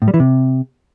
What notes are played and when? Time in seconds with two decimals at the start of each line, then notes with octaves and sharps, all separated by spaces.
0.02 A2
0.08 G3
0.14 E3
0.20 C3